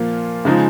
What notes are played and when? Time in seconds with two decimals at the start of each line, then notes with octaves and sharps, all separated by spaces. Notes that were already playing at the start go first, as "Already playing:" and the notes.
Already playing: A#2 F3 A#3 F4
0.45 C#3 F3 G#3 D#4